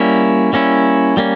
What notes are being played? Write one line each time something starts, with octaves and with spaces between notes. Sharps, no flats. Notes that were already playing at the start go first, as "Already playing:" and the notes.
Already playing: G3 A#3 C#4 E4
G3 A#3 C#4 E4
G3 A#3 C#4